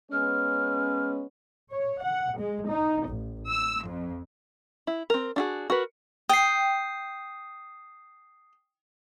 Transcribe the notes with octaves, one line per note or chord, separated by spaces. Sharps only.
G#3 B3 C#4 F6
C#5
F#5
G#3
D#4
A1
E6
F2
E4
C4 A#4
D4 F#4 G#4
F#4 A#4 B4
G5 D#6 C7